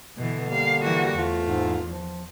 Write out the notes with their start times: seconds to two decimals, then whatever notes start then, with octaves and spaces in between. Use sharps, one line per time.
0.18 B2 D3 E3
0.50 G3 A#3 F5
0.83 E3 F#4
1.17 E2 A3 C4 F4
1.46 G#2
1.88 F3